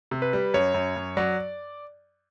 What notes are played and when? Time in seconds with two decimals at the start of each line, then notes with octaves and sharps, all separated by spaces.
0.11 C3
0.22 B4
0.33 G3
0.54 F#2 C#5
0.74 F#2
0.96 F#2
1.17 F#3 D5